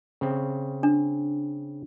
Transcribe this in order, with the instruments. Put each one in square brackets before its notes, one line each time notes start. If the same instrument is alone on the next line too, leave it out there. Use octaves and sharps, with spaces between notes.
[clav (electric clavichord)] C#3 C4
[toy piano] D4